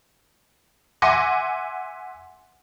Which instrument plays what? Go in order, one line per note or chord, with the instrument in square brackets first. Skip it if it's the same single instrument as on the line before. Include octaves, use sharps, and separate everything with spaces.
[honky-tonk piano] E5 F#5 G#5 C6 D6 A#6